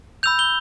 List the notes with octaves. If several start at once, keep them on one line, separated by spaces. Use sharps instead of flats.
B5 E6 G6 F7
G7